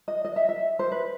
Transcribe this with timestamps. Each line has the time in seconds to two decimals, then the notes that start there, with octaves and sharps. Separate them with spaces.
0.08 D#5
0.25 D#5
0.36 E5
0.49 E5
0.79 C5
0.91 B4